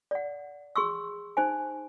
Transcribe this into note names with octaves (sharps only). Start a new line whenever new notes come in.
D5 F#5
G#4 C6 C#6 E6
D#4 C5 G#5